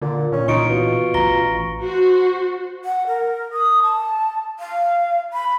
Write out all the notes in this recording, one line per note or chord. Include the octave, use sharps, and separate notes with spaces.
A#2 D3
A#2 C#4
A#2 E3 D#4 F4 C#6 C#7 D7
B2
A1 A#5 A#6 G7
F#4 C5
F#5
A#4
D#6
A5
F5
B5